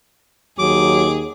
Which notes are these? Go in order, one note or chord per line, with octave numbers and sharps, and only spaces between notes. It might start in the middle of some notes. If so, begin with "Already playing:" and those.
D#2 F#3 G#4 D6